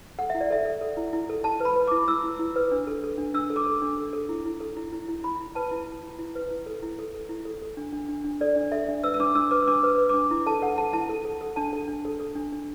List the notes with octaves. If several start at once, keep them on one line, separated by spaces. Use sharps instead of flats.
A4 F#5
E4 E5
D5
A4 E5
A4
A4
E4
E4
A4
E4 A5
B4 B5
B4
D6
E4
E4 E6
E4
E4
B4
D4
A4
A4
D4
D4 E6
A4
D6
A4
D4
A4
A4
E4
E4
A4
E4
E4
E4
E4 B5
E4
B4 A5
E4
E4
E4
E4
B4
E4
A4
E4
A4
A4
E4
A4
A4
D4
D4
D4
D4
A4 D5
D4
A4 E5
D4
B4 E6
E6
D4 D6
D4 E6
B4 D6
D4 D6
B4
B4
D6
D4
E4
A4 A5
A4 F#5
A4 A5
E4 A5
A4
A4
A4
D4 A5
A4
D4
A4
A4
D4
D4